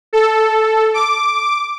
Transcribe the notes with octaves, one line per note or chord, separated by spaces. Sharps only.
A4
D6